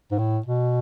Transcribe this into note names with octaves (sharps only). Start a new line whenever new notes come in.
G#2
A2
B2